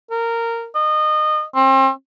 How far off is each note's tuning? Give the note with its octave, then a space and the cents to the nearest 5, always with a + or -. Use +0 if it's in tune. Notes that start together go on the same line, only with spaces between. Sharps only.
A#4 -15
D#5 -25
C4 +35